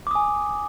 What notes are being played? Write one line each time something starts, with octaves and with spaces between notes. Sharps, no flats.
G#5 D6 D#6